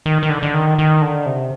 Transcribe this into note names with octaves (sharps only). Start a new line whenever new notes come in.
D#3
D#3
D3
D3
D#3
D#3
D3
C3